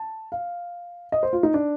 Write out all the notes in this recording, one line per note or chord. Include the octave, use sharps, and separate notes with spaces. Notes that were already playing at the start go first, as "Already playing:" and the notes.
Already playing: A5
F5
D#5
C5
F4
D#4
D4